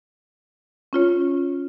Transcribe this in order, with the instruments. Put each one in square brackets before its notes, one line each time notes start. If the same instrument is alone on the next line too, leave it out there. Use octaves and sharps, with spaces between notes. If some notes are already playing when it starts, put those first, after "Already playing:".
[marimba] C#4 F4 C#5